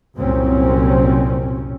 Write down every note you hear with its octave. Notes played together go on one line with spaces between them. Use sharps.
C2 F#2 A#2 C4 C#4